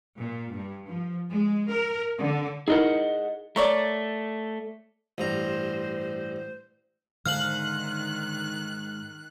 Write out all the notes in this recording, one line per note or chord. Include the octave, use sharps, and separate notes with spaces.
A#2
G2
F3
G#3
A#4
D3
D#4 E4 G#4 A#4 D#5 F#5
A3 A#4 C#5 D5 A#5
A1 G2 C5 A#5
G#2 D3 D#3 C5 F5 F6 F#6 F#7